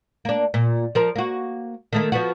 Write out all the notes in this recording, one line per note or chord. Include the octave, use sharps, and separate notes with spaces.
A#3 D4
A#2
F3 A#4
A#3 F#4
D#3 A3 A#3
F3 B3 F#4